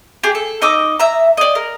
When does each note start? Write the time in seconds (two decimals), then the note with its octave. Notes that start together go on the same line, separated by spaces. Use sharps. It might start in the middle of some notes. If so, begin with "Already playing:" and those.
0.24 G4 G#4
0.35 A4
0.62 D#4 D#5 D6 E6
1.00 E5 A#5
1.37 D5 D#5
1.55 A#4